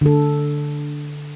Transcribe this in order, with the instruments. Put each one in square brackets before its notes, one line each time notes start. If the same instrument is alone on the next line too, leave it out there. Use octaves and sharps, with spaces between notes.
[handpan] D3 A4